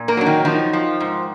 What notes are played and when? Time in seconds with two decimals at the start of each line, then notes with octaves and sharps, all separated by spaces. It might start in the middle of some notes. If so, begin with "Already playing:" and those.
Already playing: A#2
0.08 A#3 A#4
0.17 F#3 D4
0.26 D#3 D#4
0.45 D#3 F3 D#4
0.73 F3
1.00 G#2